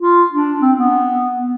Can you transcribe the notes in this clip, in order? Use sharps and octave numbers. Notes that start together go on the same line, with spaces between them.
F4
D4
C4
B3